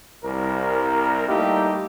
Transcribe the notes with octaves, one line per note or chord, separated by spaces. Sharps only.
C2 A#4
G3 A3 A#3 D#4 E4 G4